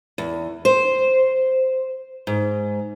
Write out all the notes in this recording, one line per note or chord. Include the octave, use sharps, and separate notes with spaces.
E2
C5
G#2